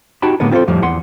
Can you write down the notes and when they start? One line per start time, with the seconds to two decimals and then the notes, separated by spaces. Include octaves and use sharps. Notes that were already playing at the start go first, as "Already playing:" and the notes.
0.22 D#4 F#4 G4 A5 B5
0.40 A2 D3 G#3 A#3 B3
0.51 C4 F4 G#4 A4 C5
0.68 F2 A2 F3 G3
0.82 E2 F#5 C6